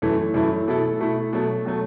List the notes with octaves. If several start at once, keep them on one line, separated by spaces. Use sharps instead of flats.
F#2 E3 A3 E4
F#2 E3 A3 E4
B2 A3 E4 A4
B2 A3 E4 A4
B2 F#3 A3
B2 F#3 A3